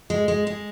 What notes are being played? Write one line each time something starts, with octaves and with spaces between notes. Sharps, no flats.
G#3
G#3
G#3